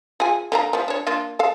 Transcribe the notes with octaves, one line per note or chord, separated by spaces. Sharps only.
F4 G#4 G#5
D3 A#3 A#5
F3 B3
D4 C#5
A#3 D4 F4
A4 F5